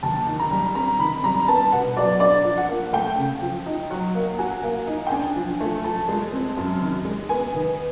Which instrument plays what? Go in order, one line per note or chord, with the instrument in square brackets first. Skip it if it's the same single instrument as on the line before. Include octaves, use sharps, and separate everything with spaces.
[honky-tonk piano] D#2 [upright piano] A5
[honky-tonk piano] D#3
[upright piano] A#5
[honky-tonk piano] G3
[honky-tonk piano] C4 [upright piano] A#5
[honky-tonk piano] D#3 [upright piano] B5
[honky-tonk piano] G3 [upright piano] A#5
[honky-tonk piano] B3 [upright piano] A5
[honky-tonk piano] B2 [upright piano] F#5
[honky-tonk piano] F#3 [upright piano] D5
[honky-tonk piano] D4 [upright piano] D5
[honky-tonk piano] F3
[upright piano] F#5
[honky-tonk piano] A#3
[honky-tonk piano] A3 [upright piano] G5
[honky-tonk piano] C#3
F3
D#4
F#3
A#3
[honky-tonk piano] F#4 [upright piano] G#5
[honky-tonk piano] A#3
D#4
[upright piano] G5
[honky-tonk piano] D4 [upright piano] G#5
[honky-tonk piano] F3
A3
[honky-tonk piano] F3 [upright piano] A5
[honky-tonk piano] G#3
C4
F#2
D#3
G#3
[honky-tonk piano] B3 [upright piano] G#5
[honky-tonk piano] D#3